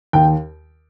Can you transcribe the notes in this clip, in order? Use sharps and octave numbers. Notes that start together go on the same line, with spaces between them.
D#2 G5